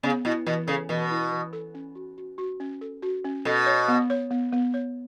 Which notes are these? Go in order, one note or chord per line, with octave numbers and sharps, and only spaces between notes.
C#3 B3
B2 E4
B2 E3
C#3 A4
B2 E3
E4
E3
A4
C#4
F#4
F#4
F#4
C#4
A4
F#4
C#4
B2 A4
C#5
B3
C#5
B3
B3
C#5